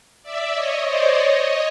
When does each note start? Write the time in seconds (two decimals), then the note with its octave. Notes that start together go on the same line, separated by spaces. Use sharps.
0.22 D5 E5
0.53 C#5 D#5
0.84 C5 D5
1.15 C#5 D#5